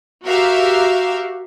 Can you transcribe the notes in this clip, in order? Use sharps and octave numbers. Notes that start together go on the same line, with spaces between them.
F#4 G4 A#4 E5 F5